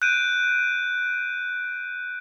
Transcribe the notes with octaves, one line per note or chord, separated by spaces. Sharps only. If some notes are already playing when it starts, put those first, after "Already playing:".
F#6 G6 D7 D#7